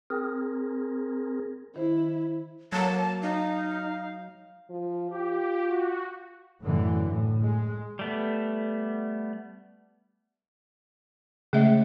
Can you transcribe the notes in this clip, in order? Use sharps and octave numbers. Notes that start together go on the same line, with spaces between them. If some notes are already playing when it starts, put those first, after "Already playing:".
C4 G#4 A#4
D#3 E4 C5
F#3 A#3 A5
D#4 F5
F3
F4 G4
F#4
F#2 A2 D3 E3
A2
G#3
G3 A3 B3
C#3 G#3 A3 E5